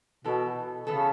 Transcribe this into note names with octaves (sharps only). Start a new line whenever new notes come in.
B2 E3 B3 A4
C#3 E3 B3 A4